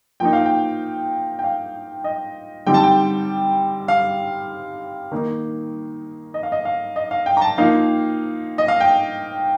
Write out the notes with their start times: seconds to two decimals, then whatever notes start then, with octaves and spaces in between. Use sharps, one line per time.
0.20 F3 A#3 D#4 G5
0.33 F5
0.46 G5
1.39 G5
1.44 F5
2.04 D#5
2.66 D3 G3 C4 D#4 G5
2.74 A5
2.83 G5
3.88 F5
5.12 D#3 A#3 D#4
6.34 D#5
6.43 F5
6.52 D#5
6.65 F5
6.96 D#5
7.11 F5
7.26 G5
7.37 A#5
7.41 A5
7.58 F3 A#3 D#4 F5
8.58 D#5
8.68 F5
8.80 G5